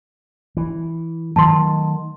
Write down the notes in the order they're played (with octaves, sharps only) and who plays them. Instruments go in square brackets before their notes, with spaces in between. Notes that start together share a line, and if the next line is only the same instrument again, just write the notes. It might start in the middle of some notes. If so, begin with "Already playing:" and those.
[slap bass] E3
[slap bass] D#3 F#3 A3 [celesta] A5 C6